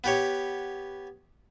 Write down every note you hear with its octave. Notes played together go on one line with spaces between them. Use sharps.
B3 G4 C#5